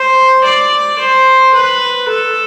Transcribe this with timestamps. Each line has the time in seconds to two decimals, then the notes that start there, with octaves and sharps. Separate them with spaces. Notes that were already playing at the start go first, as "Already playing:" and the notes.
Already playing: C5
0.44 D5
0.99 C5
1.54 B4
2.08 A4